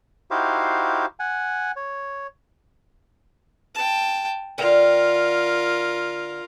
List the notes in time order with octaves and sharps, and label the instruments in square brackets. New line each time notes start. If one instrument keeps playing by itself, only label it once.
[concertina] D#4 E4 F#4 G4 C5 F5
F#5 G#5
C#5
[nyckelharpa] G5 A5
[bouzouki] D3 G5 [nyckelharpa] F4 A#4